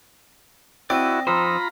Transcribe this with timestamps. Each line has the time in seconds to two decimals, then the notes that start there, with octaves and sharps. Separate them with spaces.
0.90 C4 E4 F#4 D5 D#5
1.27 F2 D#4 F4 C5 A#5 B5 D#6 E6